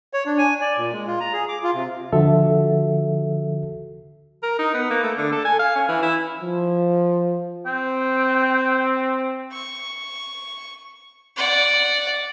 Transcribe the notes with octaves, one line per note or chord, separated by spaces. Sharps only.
C#5
D4
G#5
D5
A#2
G#3
F4
A#5
G#4
D6
F4
C3
D3 F3 F#4 A4 E5
A#4
D#4
B3
A#3
A3
D3
A4
G#5
F5
C#4
E3
E4
F3
C4 G5
C#6
D5 F#5